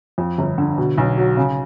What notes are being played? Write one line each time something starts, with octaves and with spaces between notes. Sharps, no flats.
F2
G1
D3
B2
B1
F#3
C#3